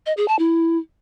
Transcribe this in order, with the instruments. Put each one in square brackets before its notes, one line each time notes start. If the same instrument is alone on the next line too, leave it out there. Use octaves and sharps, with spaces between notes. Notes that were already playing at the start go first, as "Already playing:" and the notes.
[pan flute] D#5
G#4
A5
E4